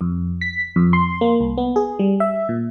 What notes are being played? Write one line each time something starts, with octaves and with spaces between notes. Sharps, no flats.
F2
B6
F2
C6
A#3
C2
B3
G#4
G3
E5
A#2